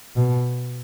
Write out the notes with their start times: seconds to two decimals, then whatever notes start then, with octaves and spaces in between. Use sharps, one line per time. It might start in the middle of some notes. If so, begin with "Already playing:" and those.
0.16 B2